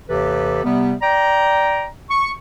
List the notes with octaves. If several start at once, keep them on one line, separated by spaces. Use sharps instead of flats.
D#2 C3 E3 G4 A4 B4
C3 G3 B3
D5 G5 A#5
C#6